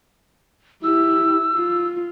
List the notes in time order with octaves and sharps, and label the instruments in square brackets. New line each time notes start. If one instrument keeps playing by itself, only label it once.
[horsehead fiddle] E4 G4 [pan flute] E6
[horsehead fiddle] F4